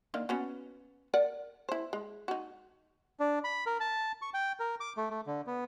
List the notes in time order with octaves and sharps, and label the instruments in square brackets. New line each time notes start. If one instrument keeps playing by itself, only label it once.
[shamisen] D3 D#3 A#3
B3 C#4 F#4
A#4 D5 F#5
E4 C5
G#3
D#4 F#4
[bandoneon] D4
B5
A#4
A5
C#6
G5
A#4
D6
A3
A3
D3
B3